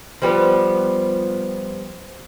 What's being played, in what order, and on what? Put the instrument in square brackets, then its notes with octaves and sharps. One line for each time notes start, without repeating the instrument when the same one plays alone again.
[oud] F3 G3 B3